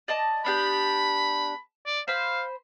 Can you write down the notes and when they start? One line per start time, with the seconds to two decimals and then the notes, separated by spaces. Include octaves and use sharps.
0.08 D5 D#5 A5
0.45 B3 D4 G4 B5
1.86 D5
2.08 C5 F5 B5